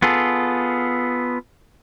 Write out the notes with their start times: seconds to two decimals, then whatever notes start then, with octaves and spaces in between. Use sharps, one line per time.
0.02 B3 F4 G#4 A4